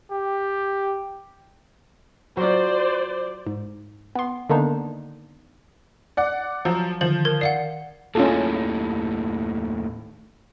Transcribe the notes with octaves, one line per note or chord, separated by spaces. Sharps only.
G4
F#3 F4 C5 D5
G#2
B3 C6
D3 D#3 A#3 B3 D4 D#4
D5 F#5
F3 F#3
D3 D#3 F3 F#7
A#4 G#6
D5 F5 F#5 C7
D#2 A2 C#4 F4 A4